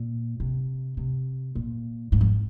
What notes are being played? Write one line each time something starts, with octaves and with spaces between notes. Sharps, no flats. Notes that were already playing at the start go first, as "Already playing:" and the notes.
Already playing: A#2
C3
C3
A#2
G#2
F2